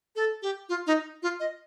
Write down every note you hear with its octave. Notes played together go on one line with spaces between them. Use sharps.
A4
G4
F4
D#4
F4
D#5